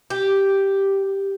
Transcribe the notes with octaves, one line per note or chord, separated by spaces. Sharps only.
G4